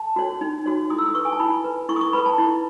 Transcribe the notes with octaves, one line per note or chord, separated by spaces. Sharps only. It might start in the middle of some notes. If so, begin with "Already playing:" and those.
Already playing: A5
F#4 C#5
D#4
F#4 C#5
E4 D#6
E6
D#6
B4 C#6
G#5
A5
E4 B5
B4
E4 C#6
D#6
C#6
B4 B5
A5
E4